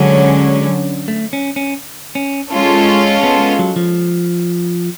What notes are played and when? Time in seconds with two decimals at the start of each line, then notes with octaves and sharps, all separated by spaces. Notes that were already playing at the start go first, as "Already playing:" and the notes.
Already playing: D3 F#3 G#3 C#4
1.08 A3
1.33 C#4
1.56 C#4
2.15 C#4
2.52 G#3 C#4 F4 A4
3.23 B3
3.41 B3
3.59 F#3
3.76 F3